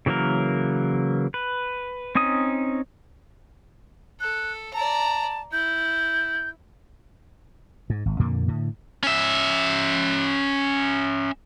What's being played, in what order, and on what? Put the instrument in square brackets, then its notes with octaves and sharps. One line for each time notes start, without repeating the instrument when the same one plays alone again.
[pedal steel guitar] C#3 E3 F#3 A#3 A#4
B4
C4 C#4 D#4 D#6
[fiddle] A4 [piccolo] F#6
[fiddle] D5 A#5 [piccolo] A5
[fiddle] E4 [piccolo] G6
[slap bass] G#2
G#1
F2 A#2 D3 A#3
A2 D3
[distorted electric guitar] C#4 E5